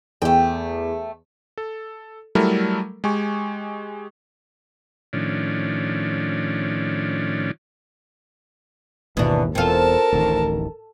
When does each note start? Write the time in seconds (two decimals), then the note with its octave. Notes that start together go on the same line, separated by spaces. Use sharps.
0.22 E2 A3 G5
1.58 A4
2.35 F#3 G3 A3 E4 A4 A#4
3.04 G#3 G4 G#5 C#6
5.13 A2 D#3 F3 C#4 D4
9.17 G#1 D#2 B2 E3 D4
9.55 E1 E2 C4 F4 A4 A#4 A5
10.12 D1 A1 D#3